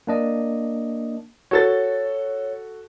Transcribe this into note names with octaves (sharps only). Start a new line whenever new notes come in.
A#3 D4 D#5
F#4 A4 C#5 A6